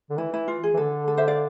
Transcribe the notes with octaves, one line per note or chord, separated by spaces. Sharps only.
D3
E3 E4
E4
F4
G#4
E3
D3 A4
A4
C5 E5
D5 F5